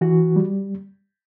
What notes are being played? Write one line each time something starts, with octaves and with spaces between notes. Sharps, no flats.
E3 F#4
G3